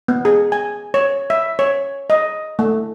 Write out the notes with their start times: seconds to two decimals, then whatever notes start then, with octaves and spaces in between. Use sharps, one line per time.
0.08 B3
0.25 G#4
0.52 G#5
0.94 C#5
1.30 E5
1.59 C#5
2.10 D#5
2.59 A3